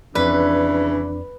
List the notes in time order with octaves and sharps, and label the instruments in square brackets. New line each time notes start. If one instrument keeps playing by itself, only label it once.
[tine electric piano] F2 D5 [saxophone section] C#3 E3 [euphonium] D4 [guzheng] B4